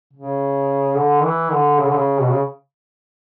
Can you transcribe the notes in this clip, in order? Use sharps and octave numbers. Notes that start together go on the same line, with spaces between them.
C#3
D3
E3
D3
C#3
D3
C#3
B2
C#3